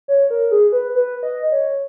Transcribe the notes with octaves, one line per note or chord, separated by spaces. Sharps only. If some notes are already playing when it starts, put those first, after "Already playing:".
C#5
A#4
G#4
B4
B4
D#5
C#5